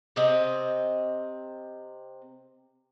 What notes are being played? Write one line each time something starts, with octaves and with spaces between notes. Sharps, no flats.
C3 C4 D#5